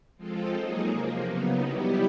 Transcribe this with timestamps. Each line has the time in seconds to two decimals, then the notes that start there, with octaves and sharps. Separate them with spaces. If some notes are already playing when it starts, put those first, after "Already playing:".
0.17 F3 G#3 C4 F4 A4
0.53 F#3 A#3 D#4 G#4
0.89 C3 F3 A#3
1.25 C#3 F#3 B3 D#4
1.62 G3 B3 E4 G4